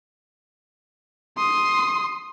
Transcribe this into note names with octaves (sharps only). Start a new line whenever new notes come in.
C6 D#6